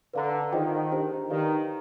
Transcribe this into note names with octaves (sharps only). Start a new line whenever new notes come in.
D3 B4 D5 F5 A#5
D#3 F4 G#4 C5 D#5 G5
D4 G4 C5 D#5
D#3 G4 B4 D5 F5